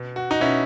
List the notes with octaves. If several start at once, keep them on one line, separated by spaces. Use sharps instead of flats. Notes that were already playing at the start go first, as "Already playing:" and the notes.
Already playing: B2
F#4
D#4 F#4
B2 C#4 E4